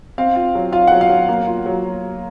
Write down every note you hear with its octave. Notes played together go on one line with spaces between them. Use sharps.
C4 F5
F4
F#3
F4 F5
F#3 F#5
F5
F#3
A#3
F4
F#3